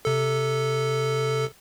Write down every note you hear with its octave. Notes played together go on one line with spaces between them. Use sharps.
C3 A4